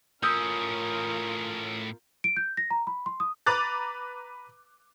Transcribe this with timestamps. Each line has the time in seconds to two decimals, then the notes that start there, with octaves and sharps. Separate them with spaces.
0.23 A2 C#4 F4 A#4 D#6 E6 G6
2.24 D7
2.37 G6
2.57 A#6
2.70 A#5
2.87 B5
3.06 C6
3.20 D#6
3.46 B4 A#5 D6 F#6 A6